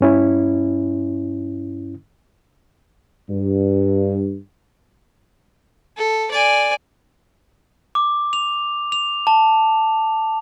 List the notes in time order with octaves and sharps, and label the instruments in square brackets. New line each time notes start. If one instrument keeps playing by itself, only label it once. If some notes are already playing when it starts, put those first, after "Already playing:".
[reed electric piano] G2 C#4 E4
[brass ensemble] G2
[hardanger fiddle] A4
D5 G#5
[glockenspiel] D6
F7
F7
A5